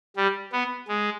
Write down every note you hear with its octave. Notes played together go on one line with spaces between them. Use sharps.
G3
B3
G#3